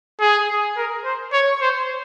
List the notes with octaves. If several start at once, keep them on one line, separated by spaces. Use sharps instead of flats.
G#4
A#4
C5
C#5
C5